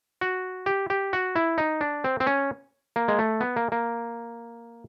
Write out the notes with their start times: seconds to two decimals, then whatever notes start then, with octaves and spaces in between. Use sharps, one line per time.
0.21 F#4
0.66 G4
0.90 G4
1.13 F#4
1.36 E4
1.58 D#4
1.81 D4
2.04 C4
2.20 C4
2.27 C#4
2.96 A#3
3.08 G#3
3.19 A3
3.41 B3
3.56 A#3
3.72 A#3